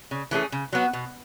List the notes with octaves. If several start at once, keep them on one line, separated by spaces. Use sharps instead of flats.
C#3
E3 A3 C#4 G#4
C#3
F#3 B3 F#4
B2